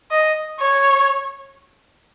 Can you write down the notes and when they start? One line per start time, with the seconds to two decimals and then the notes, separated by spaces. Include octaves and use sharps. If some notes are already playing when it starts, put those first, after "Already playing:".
0.11 D#5
0.60 C#5